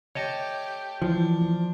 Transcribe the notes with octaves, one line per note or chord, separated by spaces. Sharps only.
A3 G4 C#5 D#5 A5
E3 F3 D4